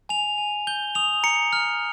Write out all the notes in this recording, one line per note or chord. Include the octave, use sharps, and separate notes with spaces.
G#5 F7
G#5
G6 G7
D#6 F7
A#5 C#7
F6